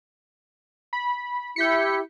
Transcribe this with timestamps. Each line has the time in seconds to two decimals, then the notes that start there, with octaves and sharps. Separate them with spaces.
0.93 B5
1.56 E4 G4 G6 B6 C#7